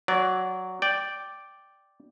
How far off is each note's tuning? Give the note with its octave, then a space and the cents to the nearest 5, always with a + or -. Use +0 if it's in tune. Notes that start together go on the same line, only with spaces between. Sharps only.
F#3 +0 D5 -15
D5 +0 G5 +0